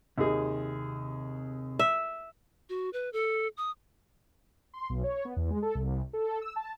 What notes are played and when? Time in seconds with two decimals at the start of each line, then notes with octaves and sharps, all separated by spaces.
0.18 D#2 C3 D#3 C4 G#4
1.79 E5
2.69 F#4
2.93 B4
3.13 A4
3.57 D#6
4.74 C6
4.90 B1
5.04 C#5
5.25 B3
5.36 E2
5.50 G#3
5.62 A4
5.75 C2
6.13 A4
6.42 E6
6.56 A5